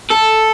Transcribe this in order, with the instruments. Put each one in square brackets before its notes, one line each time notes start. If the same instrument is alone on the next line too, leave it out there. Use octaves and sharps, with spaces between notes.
[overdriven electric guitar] A4